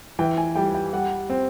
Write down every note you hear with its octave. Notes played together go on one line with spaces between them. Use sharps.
E3 G5
G#5
G3 G5
G5
G3 F#5
C4